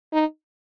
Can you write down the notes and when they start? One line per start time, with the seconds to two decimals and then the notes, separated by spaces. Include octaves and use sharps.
0.13 D#4